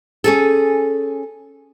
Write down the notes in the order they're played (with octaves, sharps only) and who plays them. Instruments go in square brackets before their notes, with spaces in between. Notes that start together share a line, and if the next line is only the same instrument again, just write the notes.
[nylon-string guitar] C#4 G#4 A4